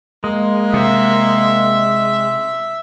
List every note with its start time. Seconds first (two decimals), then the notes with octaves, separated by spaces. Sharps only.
0.24 G#3 A#3
0.74 C3 E5